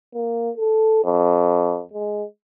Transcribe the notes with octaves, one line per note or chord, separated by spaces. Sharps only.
A#3
A4
F2
G#3